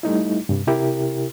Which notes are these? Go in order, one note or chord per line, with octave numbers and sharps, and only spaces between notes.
G3 A3 D#4 E4
G2 C3 G3
C3 E4 G4 A#4